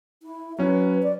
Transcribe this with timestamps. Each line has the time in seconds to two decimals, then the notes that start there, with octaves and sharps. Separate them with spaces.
0.22 E4
0.59 F#3 C#4 B4
1.03 D5